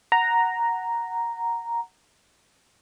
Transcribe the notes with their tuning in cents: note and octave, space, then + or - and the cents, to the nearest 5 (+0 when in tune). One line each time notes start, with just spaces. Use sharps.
F#5 +0 A#5 +0